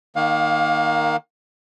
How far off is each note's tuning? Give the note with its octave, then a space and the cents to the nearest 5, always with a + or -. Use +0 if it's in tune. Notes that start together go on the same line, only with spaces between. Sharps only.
D#3 +0 A#3 +0 F5 +30